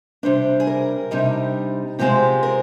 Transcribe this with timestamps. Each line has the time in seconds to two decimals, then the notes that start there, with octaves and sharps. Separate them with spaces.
0.23 C3 G3 D4 C5
0.60 G#4
0.67 A#4
1.11 C3 G3 D4 D#4
1.99 C3 F3 G#3 C4 G4
2.43 A#4